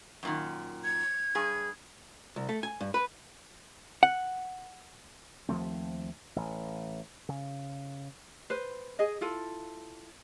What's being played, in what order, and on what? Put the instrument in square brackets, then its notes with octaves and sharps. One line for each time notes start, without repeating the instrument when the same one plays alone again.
[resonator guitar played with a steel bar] F#2 A#2 D#3
[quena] G#6
[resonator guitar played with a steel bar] G2 G#4
[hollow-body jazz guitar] C2
A3
G#5
G2
B4
F#5
[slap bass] D#2 F3 A3 C4
A1
C#3
[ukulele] B4 C5
G#4 D#5
E4 F4 A4